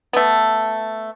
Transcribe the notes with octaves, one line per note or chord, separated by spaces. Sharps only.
A3 B3